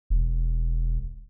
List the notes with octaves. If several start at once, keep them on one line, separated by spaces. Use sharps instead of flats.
E1